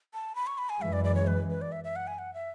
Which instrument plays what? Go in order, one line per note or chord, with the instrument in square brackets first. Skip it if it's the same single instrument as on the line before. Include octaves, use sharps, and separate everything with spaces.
[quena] A5
B5
C#6
B5
G#5
[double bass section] F#2 E3 G#3 [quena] E5
[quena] D5
D5
C#5
B4
B4
D5
E5
E5
F#5
G#5
F#5
E5